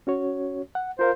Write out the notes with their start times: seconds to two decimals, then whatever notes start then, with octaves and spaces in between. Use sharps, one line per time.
0.07 C#4 F#4 C#5
0.75 F#5
0.99 F4 A#4 C5 F5